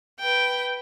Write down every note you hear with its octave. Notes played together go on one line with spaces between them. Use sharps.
B4 G5